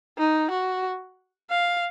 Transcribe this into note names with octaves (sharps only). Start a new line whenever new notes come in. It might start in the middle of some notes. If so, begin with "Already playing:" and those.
D#4
F#4
F5